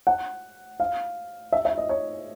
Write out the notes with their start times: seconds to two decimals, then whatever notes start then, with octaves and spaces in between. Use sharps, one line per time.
0.07 F#5
0.80 F5
1.52 E5
1.65 E5
1.78 D#5
1.89 C#5